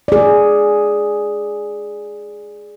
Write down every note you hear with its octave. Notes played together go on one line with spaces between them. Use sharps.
G#4 D5